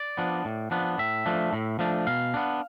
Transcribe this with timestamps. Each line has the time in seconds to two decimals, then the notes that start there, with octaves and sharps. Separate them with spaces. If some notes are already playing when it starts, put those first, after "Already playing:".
Already playing: D5
0.17 F3 B3 D4
0.45 A2
0.71 F3 B3 D4
0.98 A2 E5
1.26 F3 A3 D4
1.53 A2
1.79 F3 A3 D4
2.07 B2 F5
2.34 B3 D4